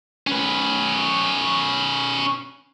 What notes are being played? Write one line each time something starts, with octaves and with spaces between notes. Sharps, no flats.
C#4 B4